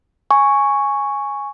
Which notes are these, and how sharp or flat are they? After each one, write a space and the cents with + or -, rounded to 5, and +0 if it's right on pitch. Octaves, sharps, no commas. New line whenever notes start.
G#5 +0 C#6 +0